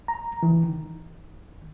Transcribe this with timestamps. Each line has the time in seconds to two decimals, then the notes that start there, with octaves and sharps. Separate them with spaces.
0.08 A#5
0.43 E3
0.64 D#3